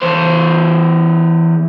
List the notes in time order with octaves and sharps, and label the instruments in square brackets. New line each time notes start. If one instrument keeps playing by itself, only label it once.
[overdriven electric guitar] E2 C5